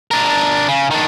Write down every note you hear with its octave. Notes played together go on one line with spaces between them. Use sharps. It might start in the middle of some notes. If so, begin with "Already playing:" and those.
D4 A#4
C#3
D#3 D4